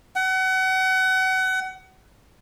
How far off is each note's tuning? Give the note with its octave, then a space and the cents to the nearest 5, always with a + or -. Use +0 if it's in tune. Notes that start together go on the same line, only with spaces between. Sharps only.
F#5 +30